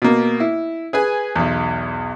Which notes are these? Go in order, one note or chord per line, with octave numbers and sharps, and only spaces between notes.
B2 A#3
E4
G#4 B4 G#5
B1 E2